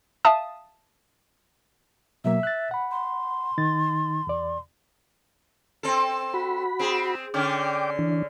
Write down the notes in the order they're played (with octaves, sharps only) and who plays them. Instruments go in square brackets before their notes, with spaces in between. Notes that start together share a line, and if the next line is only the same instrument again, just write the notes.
[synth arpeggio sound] E5 F5 A5 D#6
[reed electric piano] B2 F#3 A#3 [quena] E5
[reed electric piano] F#6 A6
F#5 B5
[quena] C6
[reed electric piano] D#3 D#4 A6
E2 D5
[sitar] C4 A4
[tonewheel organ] F#4 B5
[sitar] C4 G#4
[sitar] D3 C#4 [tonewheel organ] G5 D6
[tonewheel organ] E3 D4